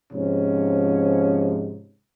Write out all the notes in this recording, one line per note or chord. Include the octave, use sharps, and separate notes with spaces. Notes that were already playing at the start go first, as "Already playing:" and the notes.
G#2 C3 F3 C#4